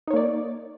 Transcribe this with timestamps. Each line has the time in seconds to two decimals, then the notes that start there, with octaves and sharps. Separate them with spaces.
0.07 D#4
0.10 C#5
0.13 A#3
0.16 D5